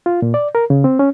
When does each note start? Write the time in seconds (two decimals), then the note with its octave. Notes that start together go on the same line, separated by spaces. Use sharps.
0.06 F4
0.22 A#2
0.34 D5
0.55 A#4
0.70 C#3
0.84 C4
0.99 C#4